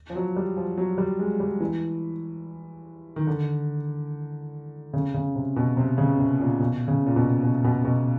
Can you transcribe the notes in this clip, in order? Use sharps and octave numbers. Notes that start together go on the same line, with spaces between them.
F3
F#3
G3
F3
F#3
G3
G#3
G3
E3
D#3
D3
C#3
C#3
C3
B2
C3
C#3
C3
A#2
B2
C#3
A#2
B2
B2
B2
B2